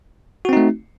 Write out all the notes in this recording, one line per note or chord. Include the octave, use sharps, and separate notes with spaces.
A3 C4 D#4 F#4